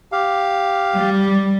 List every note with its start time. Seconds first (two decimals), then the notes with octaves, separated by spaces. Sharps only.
0.12 G4 F5
0.96 G3